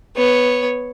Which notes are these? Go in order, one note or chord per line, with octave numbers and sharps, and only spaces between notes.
B3 C#5